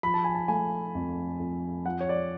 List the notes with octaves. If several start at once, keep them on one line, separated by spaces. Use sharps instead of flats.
F3 B5
A5
G#5
A5
A3 G#5
F2
F2
F3 F#5
C#5
D5